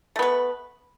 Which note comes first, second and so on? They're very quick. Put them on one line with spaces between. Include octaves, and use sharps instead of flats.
A3 B3 B4